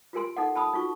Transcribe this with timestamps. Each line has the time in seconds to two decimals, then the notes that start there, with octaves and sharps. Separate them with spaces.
0.13 F4 G4 A#4 G#5 C6
0.37 D#4 A4 F#5
0.56 A5 B5 D#6
0.73 D#4 F4 F#4 C#6